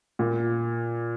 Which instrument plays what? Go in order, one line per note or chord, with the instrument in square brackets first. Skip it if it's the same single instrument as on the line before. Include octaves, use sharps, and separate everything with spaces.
[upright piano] A#2